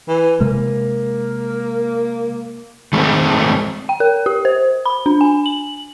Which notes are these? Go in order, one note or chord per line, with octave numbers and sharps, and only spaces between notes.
E3
C3 G#3 A#3
D#3 G#3 A3 C4
G5
A#4
G4
C5
B5
D4
G#5
F#7